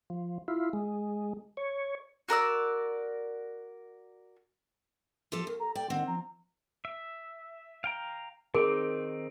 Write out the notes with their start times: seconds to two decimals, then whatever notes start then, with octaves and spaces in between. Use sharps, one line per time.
0.10 F3
0.48 E4 F4
0.73 G#3
1.57 C#5
2.29 F#4 A#4 D5 E6
5.32 F3 F4 G4 A4
5.47 D#2 A#4
5.60 A4 A#5
5.75 D5 G5
5.90 D#3 C4 F#5
6.07 F3 A#5
6.85 E5
7.84 F5 G5 A#5
8.55 D#3 C4 D#4 G#4 A#4